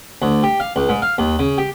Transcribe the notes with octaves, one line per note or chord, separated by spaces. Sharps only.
D2
G4
F5
C#2
G#2
F5
D#2
C#3
G4